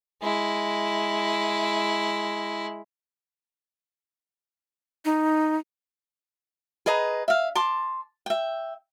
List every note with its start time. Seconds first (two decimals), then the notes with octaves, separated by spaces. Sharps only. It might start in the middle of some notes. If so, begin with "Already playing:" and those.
0.23 G#3 E4
5.05 D#4
6.86 G#4 B4 D#5 A#5
7.28 E5 F5
7.55 A5 C6 D6
8.26 E5 G5